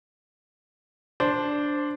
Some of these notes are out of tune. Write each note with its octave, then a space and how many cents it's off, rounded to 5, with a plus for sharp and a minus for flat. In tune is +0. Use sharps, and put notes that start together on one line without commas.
D4 -5 C5 +0